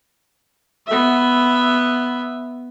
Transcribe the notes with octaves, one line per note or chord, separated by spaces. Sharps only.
B3 E5